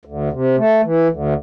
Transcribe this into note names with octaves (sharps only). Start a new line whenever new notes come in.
D2
C3
A3
E3
D2